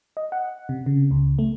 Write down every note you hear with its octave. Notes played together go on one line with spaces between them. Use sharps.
D#5
F#5
C3
C#3
C#2
A3